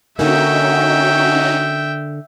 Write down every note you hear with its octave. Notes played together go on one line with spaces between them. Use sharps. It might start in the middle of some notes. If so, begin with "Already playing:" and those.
D3 A#3 C#4 D#4 F#4 E5 G5